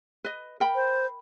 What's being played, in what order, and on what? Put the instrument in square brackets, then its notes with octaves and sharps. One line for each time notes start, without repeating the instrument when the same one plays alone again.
[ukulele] B4 D#5
A#4 G5 B5
[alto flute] C5